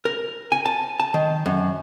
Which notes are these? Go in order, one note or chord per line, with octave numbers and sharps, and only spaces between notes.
A#4
G#5
A5
A5
D#3
F#2